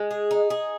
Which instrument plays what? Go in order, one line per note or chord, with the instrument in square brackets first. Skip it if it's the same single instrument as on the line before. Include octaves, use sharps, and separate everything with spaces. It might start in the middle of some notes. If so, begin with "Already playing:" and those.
Already playing: [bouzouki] G#3
G#4
D#4
G#4